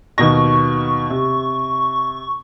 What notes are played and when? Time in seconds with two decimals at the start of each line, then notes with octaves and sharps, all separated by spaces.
0.18 D#2 B2 C#6 A#6
1.10 C3